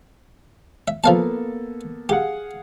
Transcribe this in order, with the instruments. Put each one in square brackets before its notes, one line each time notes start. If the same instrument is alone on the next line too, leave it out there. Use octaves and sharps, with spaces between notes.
[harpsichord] E5
[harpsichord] F3 F5 A5 [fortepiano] A#3 B3 A4
[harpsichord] G4 [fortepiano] G#4 F5 F#5